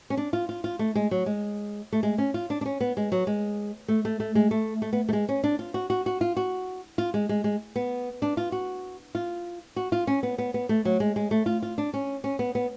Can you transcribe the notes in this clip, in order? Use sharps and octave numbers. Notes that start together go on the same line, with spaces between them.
C#4
D4
F4
F4
F4
A3
G#3
F#3
G#3
A3
G#3
C#4
F4
D4
D4
C#4
B3
G#3
F#3
G#3
A3
A3
A3
G#3
A3
A3
B3
A3
G#3
C#4
D4
F4
F#4
F#4
F#4
F4
F#4
F4
G#3
G#3
G#3
B3
D4
F4
F#4
F4
F#4
F4
C#4
B3
B3
B3
A3
F#3
G#3
G#3
A3
F4
F4
D4
C#4
C#4
B3
B3